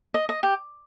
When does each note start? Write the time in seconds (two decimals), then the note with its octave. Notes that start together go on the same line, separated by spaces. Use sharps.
0.14 D#5
0.29 D#5
0.43 G4